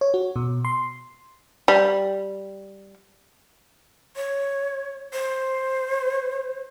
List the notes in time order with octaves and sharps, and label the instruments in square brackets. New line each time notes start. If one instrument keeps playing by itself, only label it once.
[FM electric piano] C#5
F#4
B2
C6
[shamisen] G3
[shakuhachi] C#5
C5